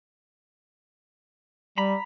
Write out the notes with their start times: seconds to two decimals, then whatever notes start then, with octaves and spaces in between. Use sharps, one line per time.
1.78 G3 A#5 B5